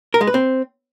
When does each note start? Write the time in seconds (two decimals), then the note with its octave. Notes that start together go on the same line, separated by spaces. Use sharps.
0.14 A#4
0.21 G#3
0.27 B4
0.34 C4